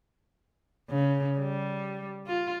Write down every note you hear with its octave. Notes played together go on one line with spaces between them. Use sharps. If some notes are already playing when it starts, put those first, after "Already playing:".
C#3
G3
F4